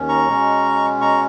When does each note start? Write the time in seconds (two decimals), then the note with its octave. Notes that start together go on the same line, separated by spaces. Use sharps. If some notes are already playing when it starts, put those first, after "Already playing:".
Already playing: D#2 D#3 C#4
0.09 A#5 C#6
0.27 B2 G#3 C#4
1.01 A#5 C#6